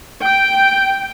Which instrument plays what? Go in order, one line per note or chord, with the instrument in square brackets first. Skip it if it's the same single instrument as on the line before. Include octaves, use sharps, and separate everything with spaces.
[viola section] G5